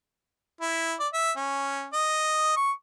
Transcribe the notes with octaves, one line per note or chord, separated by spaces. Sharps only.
E4
D5
E5
C#4
D#5
C#6